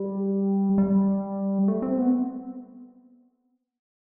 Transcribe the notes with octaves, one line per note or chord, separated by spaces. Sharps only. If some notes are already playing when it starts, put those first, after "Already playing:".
Already playing: G3
G3
A3
C4
B3